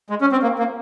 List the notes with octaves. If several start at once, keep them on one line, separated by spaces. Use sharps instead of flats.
G#3
C#4
C4
A#3
A#3